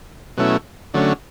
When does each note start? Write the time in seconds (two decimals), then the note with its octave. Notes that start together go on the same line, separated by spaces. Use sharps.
0.37 B2 F#3 A3 C#4 E4
0.94 D3 F#3 A3 C#4